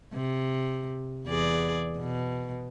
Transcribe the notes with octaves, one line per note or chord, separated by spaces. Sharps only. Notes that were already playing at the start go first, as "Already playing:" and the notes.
C3
E2 G#4 D5
B2